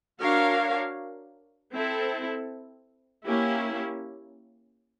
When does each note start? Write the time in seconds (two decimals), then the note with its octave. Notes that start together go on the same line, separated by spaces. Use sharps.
0.20 D4 F#4 A#4 C#5 F5
1.73 C4 E4 A4
3.25 A#3 C#4 E4 G4